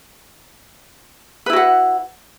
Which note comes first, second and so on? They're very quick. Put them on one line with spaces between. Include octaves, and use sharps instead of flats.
B4 E4 F#4 F#5